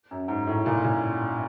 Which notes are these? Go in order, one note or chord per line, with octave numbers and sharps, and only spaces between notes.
F#2
G#2
A2
A#2
A#2